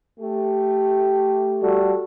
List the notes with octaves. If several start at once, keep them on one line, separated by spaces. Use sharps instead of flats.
A3 G4
G3 F#4 A4